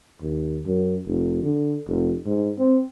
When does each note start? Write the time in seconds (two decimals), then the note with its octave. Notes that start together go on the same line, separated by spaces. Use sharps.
0.21 D#2
0.66 F#2
1.06 F1
1.43 D3
1.88 F1
2.26 G#2
2.58 C4